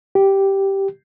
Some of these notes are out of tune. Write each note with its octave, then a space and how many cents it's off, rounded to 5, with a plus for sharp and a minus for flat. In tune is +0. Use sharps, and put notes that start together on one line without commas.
G4 -5